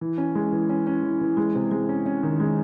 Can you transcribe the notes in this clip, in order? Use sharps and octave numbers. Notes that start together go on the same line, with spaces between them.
E3
C#4
G#3
E3
C#4
C#4
E3
E3
G#3
C3
G#3
C#4
C#4
D#3
G#3